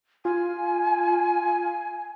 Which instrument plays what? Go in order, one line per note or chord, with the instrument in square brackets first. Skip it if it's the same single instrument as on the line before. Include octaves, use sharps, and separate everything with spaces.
[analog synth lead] F4 [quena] G#5